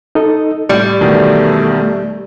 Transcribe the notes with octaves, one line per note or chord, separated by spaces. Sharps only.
D#4 A4 D#5
A2 G3 D5
E2 B2 D#3 A3